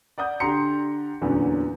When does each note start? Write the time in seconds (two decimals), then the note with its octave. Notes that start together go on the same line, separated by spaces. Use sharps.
0.18 D5 F#5 D#6 G6
0.40 D3 G4 A#5 C6 C#7
1.21 E2 A#2 D3 F#3 B3 C#4